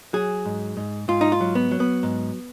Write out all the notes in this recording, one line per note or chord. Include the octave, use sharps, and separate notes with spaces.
F#3 G#4
G#2
G#2
G#2 F4
D#4
F4
F#3
B3
F#3
B3
G#2